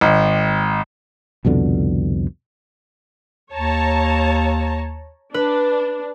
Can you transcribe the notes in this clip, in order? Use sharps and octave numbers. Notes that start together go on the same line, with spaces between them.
G#1
C2 F2 B2 D3
D#2 C#5 A5 A#5
D4 B4